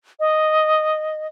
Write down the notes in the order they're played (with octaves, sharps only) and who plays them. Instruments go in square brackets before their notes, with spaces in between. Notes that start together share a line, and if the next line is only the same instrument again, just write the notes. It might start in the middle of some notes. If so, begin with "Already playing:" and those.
[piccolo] D#5